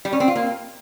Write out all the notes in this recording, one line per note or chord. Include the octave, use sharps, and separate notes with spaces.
G3
C#4
C4
F4
A#3